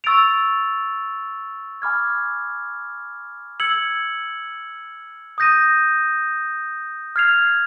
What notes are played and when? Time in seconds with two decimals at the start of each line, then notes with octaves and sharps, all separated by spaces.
0.04 C#6 E6 A6 D7 F7
1.82 G#5 B5 D6 F6 G#6
3.60 E6 G#6 C#7 F#7
5.38 D#6 G6 A#6 D#7
7.16 F6 G#6 C7 F7